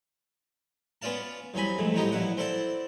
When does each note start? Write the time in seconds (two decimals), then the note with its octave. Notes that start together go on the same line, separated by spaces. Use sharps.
1.02 B3 C#4 F4 D5 F5 A5
1.54 C2 F#3 C4 G#5 B5
1.78 B1 F2 G#2 A3
1.94 A1 F#3 G3 B3 D#4 G4
2.12 A#1 E2 F#3 E4 F#5
2.37 C4 E4 A4 D5 F#5 A5